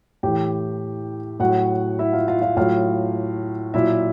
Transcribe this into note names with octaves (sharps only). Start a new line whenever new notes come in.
A2 E3 G4 G5
A2 F#3 F#4 F#5
E4 E5
F4 F5
F4 F5
F4 F5
A2 F#3 F4 F5
A#2 F#3 E4 E5